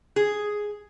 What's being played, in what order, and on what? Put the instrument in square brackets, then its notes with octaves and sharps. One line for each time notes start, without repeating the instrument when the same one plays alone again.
[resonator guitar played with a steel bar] G#4